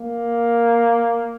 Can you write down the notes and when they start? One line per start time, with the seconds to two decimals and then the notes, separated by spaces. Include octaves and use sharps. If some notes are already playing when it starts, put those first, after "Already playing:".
Already playing: A#3